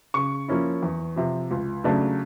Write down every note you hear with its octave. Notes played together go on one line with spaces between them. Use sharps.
C#3 C#6
F3 A#3 C#4 E4
E2
C3 F3
C#2
C#3 F#3 A3 D4